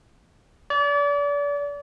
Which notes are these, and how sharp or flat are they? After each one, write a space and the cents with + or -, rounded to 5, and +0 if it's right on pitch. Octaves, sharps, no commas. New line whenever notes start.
D5 -35